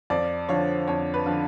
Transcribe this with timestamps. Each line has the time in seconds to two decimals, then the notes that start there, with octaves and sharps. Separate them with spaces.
0.10 F2 D5
0.49 D3 F3 C#5
0.88 F2 C#5
1.14 B4
1.26 D3 F3